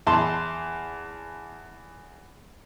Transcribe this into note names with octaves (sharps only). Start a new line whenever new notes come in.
E2 A5 C6